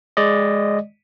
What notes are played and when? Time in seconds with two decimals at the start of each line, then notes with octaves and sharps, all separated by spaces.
0.17 G#3 D5 D#5